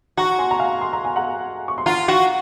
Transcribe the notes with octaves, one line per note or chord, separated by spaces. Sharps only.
F#4 A#5 C#6
G#5 C6
A#5
F5 G#5
C6
A#5
G#5
F#5 A#5
C#6
C6
F4 F#5 A#5
F#4